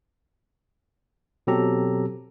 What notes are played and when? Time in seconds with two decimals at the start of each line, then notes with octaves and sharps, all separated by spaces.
1.47 B2 F#3 C4 G4 A4 A#5